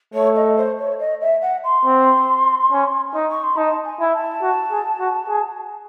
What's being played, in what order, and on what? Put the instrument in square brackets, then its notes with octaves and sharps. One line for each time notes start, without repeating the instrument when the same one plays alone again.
[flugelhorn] A3 [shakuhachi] C#5
[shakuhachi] D#5
C5
C#5
D#5
E5
F#5
C6
[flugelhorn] C4
C#4
D#4
[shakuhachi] C#6
C6
[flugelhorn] D#4 [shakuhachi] A5
[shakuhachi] G#5
[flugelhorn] E4
[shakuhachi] A5
[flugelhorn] F#4
G#4
F#4
G#4